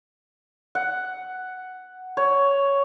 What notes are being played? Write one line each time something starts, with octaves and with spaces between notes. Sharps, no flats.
F#5
C#5